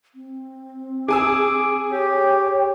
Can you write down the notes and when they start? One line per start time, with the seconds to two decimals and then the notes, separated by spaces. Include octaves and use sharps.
0.15 C4
1.08 G#4 G#5 D6 E6
1.92 G4 C#5 G5